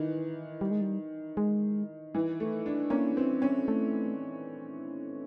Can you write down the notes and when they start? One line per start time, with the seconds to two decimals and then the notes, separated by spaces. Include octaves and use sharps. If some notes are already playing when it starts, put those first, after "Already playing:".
Already playing: D#3 E3
0.61 G3
0.71 G#3
0.81 G3
1.37 G#3
2.15 E3
2.40 A3
2.66 D4
2.90 A#3 C#4
3.17 C4
3.42 C#4
3.68 A3